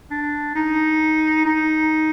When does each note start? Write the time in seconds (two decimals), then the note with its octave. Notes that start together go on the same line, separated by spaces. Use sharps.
0.11 D4
0.55 D#4
1.45 D#4